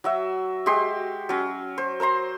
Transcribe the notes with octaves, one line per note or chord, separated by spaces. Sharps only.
F#3 F#4 E5
G#3 F#4 G4 C6
F#3 C#4
C5
A#4 C5 A#5 C6